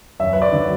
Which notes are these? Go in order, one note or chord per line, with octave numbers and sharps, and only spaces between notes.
F#2 E5
B4
D5
D3 F#3